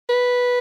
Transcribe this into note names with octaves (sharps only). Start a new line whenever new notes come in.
B4